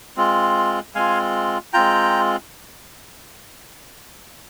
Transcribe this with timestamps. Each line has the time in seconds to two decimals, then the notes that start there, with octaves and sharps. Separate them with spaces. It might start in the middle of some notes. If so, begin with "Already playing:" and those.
0.17 G#3 C4 F4
0.95 G#3 C4 F4 F5 G#5
1.73 G#3 C4 F4 G5 A#5